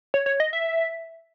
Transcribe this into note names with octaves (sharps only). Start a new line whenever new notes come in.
C#5
C#5
D#5
E5